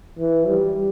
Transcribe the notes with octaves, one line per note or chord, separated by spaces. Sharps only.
E3
G3